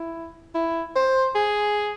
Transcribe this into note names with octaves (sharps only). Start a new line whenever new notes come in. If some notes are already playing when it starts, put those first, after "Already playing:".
Already playing: E4
E4
C5
G#4